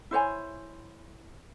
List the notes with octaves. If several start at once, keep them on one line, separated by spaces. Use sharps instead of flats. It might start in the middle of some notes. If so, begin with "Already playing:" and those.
E4 C5 C#5 G#5